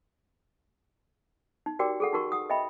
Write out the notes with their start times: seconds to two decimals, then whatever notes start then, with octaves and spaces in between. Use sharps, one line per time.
1.66 D#4
1.79 F#4 G4 A#4 D5 G5 D6
2.00 G#4 A4 F#5
2.13 D#4 F#4 A#4 C#6
2.32 F#5 D#6
2.50 D#5 E5 G5 B5